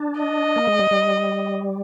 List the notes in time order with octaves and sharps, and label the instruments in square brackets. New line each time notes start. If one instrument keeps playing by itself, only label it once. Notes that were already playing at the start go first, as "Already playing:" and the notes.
Already playing: [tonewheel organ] D4
[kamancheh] D#5
[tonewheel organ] A#3
G#3
G3
G3